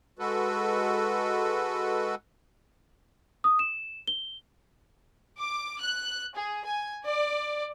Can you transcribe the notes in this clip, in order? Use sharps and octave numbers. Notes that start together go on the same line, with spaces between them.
G#3 F#4 A4 B4
D#6
E7
G7
D6
F#6
G#4
G#5
D5